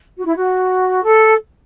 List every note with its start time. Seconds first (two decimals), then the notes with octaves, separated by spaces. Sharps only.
0.16 F#4
0.26 E4
0.35 F#4
1.03 A4